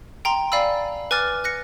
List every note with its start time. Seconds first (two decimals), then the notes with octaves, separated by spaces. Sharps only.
0.25 G5 A#5 C6
0.52 D5 F5 G#5 B5 E6
1.11 B4 G#5 D6 F6 A6
1.44 F#6 A#6 C#7